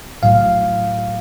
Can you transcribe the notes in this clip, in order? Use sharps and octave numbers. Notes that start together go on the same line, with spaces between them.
B1 A2 F#3 F5